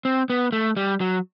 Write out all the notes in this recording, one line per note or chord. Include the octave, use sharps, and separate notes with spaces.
C4
B3
A3
G3
F#3